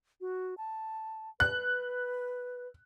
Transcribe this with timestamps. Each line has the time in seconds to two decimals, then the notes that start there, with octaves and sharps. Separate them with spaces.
0.21 F#4
0.58 A5
1.40 B4 F#6